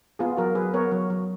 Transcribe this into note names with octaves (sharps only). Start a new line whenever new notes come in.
B3 F4 G#4
F#3 F#4 A#4
F#3 G#4 B4
B3 A#4 C#5
F#3
F#3